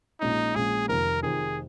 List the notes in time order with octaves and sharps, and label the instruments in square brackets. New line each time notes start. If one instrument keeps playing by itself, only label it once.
[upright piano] A#1 A#2 G#3 C#4 [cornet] D#4
[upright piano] A#1 A#2 G#3 C#4 [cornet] G#4
[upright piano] F1 F2 D#3 [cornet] A#4
[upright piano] F1 F2 D#3 [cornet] G#4